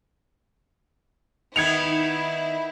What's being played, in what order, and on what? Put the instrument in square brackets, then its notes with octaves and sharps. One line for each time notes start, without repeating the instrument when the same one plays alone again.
[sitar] D#3 B3 [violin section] E4 [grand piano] G#6 C#7 F7